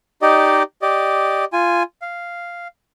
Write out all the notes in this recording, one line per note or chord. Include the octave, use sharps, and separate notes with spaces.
D#4 G4 D5 D#5
G4 D5 D#5
F4 G#5
F5